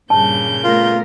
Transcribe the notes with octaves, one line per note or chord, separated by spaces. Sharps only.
G2 A#2 C#3 A5 G6
A3 B3 F4 A#4